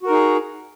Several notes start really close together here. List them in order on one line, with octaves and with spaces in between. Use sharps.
F#4 A#4 D#4 G#4